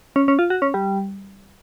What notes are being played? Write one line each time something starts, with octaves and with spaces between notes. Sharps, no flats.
C#4
C#4
F4
F#4
C#4
G3